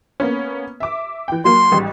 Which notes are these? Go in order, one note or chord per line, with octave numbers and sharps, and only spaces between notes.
A#3 B3 C#4
E5 D6
E3 G5
F#3 A#3 C6
A1 G#2 G3